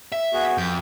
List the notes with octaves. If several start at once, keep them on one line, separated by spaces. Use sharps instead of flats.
E5
B3 F#4 G#4
F2 G6